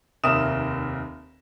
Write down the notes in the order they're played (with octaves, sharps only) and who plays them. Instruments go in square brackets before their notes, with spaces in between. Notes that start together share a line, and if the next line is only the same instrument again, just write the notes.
[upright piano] F1 D#2 A#4 E5 D#6 E7